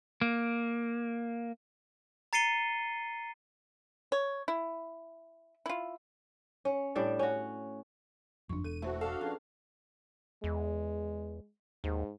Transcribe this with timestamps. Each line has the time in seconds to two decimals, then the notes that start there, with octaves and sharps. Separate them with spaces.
0.21 A#3
2.33 A#5 A6 C7 C#7 D#7 G7
4.12 C#5
4.48 E4
5.66 E4 F4
6.65 C#4
6.95 A2 G3 D4
7.19 C#4 F#4
8.49 F#1 F2 D4 C#6
8.64 E1 A4 D#7
8.82 E2 A3 F#4 C5 E5
9.01 D4 F#4 A4 F5
9.21 F2 C#4 G#4 B4
10.44 E2 G#3
11.84 D#2 G#2